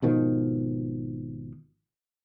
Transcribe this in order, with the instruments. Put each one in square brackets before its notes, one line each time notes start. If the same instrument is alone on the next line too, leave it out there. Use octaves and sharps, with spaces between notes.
[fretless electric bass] G#1 B2 D#3 F3